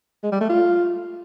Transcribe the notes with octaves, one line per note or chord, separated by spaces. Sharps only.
G#3
G3
A3
F4